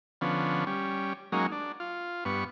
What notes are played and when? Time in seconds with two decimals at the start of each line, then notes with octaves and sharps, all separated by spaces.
0.21 D3 F3 B3 C#4
0.67 G3 C#4
1.32 F#3 G#3 A#3 C#4 D#4
1.52 D4
1.80 F4
2.25 G2 B3 C#6